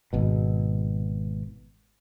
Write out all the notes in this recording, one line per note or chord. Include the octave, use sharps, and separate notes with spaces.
G#1 B2